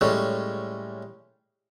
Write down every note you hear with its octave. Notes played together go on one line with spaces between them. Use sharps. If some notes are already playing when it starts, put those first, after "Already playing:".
A2 G3 G#3 C#4